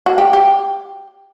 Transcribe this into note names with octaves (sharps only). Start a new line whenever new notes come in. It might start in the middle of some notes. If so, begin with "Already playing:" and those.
F#4
G4
G4